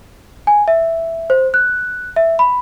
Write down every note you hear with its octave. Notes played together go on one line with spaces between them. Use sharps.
G#5
E5
C5
F#6
E5
B5